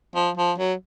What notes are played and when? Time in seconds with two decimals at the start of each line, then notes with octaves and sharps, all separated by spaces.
0.15 F3
0.37 F3
0.58 F#3